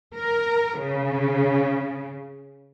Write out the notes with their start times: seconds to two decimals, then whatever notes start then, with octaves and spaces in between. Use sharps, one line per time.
0.15 A#4
0.80 C#3